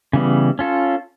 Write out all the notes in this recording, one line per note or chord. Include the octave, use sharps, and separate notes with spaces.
C#3 E3 G3 B3
C#4 F4 A4